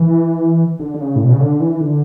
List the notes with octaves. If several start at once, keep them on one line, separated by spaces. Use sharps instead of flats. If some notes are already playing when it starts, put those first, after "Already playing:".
Already playing: E3
D3
D3
C#3
A2
B2
C#3
D3
E3
D3